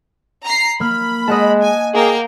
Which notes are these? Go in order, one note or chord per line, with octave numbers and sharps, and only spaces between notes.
A#5 C7
A#3 B5 F6
G#3 D#5 F#5 A5
G#5
A#3 G#4 G5